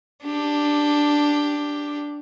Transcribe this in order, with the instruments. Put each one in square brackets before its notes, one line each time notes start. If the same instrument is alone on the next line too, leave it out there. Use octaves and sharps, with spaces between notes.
[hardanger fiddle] D4 G4